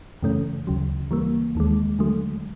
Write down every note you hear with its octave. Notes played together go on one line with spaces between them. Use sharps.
F#2 C#3 E3 A3 C#4
D2 C#3 F#3
E3 G3 A#3
D#2 D#3 G#3
D3 F#3 A3